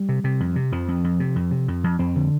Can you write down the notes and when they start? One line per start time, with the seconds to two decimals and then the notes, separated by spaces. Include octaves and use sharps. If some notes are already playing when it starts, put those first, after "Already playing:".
Already playing: G3
0.09 C3
0.24 C3
0.40 F2
0.56 C3
0.72 F2 F3
0.88 F2
1.04 F2
1.20 C3
1.36 F2
1.51 C3
1.68 F2
1.84 F2
1.99 F2 C4
2.16 D3